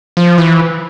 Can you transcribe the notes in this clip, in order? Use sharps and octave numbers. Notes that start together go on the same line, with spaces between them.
F3
E3